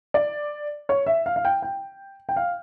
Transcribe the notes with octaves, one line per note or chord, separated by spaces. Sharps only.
D5
C#5
E5
F5
F5
G5
G5
G5
F5